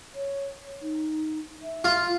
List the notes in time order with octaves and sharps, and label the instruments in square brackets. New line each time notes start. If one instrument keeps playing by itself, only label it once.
[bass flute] C#5
D#4
E5
[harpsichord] F4